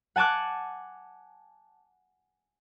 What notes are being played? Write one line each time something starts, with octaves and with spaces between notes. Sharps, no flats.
F#5 G#5 A5 D6 F#6